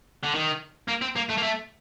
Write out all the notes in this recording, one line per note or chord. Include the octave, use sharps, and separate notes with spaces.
D3
D#3
A#3
C4
A#3
A3
A#3
A3